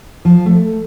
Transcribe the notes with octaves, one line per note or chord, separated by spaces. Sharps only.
F3
A3